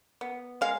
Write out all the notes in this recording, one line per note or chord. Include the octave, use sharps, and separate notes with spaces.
B3
G#3 F5